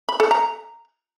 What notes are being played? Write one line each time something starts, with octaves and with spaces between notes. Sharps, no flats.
B5
A4
A#5